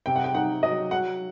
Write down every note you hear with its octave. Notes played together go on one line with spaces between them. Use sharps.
C3 G5
F#5
G5
D#4 F#5
F#3 D#5
F#3 F#5